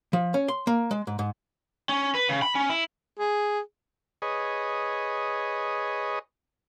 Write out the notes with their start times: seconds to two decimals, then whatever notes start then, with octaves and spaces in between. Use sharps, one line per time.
0.13 F3
0.34 C#4
0.48 C6
0.67 A#3
0.91 G#3
1.07 G#2
1.19 G#2
1.89 C#4
2.15 B4
2.29 C#3
2.42 B5
2.55 C#4
2.69 E4
3.19 G#4
4.22 G#4 B4 C#5 D#5